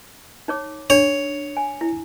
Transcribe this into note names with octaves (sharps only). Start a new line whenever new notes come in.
D#4 C#5 D6
D4 C#5
G#5
E4